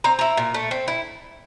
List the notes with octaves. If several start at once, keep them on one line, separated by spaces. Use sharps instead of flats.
C4 A#5
E4 A#5
A#2
A3
C4
E4